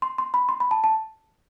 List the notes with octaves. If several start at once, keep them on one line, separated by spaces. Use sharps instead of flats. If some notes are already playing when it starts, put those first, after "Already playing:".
C6
C6
B5
C6
B5
A5
A5